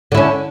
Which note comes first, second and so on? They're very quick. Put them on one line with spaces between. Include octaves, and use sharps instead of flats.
D3 E4 C#4